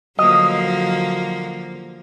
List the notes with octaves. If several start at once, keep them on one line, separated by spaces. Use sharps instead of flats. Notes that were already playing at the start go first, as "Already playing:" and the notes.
D3 F3 F#3 A#3 D#5